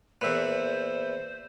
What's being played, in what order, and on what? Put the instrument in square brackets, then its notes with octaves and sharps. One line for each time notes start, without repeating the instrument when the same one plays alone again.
[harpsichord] E2 A#2 [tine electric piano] B4 E5 [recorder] C5